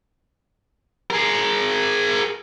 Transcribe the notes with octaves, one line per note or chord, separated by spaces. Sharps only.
G#4 A#4